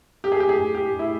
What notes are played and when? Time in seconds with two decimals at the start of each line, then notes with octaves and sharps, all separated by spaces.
0.24 G4
0.32 G#4
0.40 G4
0.49 G#4
0.75 G4
0.99 E4